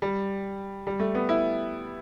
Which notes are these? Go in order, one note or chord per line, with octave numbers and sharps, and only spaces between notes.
G3
G3
A3
B3
E4